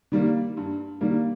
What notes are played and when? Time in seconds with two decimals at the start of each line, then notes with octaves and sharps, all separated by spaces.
0.12 D#3 G3 A#3
0.57 G2
1.01 D#3 G3 A#3